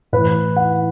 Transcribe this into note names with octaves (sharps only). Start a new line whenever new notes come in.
A2 E3 B4
F#5